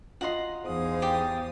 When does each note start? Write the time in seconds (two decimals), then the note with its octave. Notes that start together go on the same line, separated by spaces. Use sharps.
0.21 F4 D#5 F#5 A#5 C6
0.64 E2 D#4 G#4 C5 F5 D#6
1.02 G4 D5